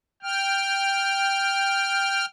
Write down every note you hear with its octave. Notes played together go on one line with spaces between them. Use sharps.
G5 F6